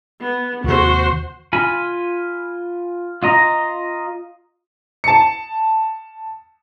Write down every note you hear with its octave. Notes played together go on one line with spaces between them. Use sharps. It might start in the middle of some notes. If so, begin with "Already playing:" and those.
B3
D#2 C3 F#4 C5
F4 G#5 B5
F4 D#5 A#5
A5 C#7